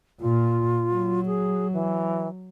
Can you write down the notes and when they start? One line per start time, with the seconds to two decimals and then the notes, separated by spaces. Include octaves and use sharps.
0.21 A#2 F4
0.92 F#3
1.27 G#4
1.73 E3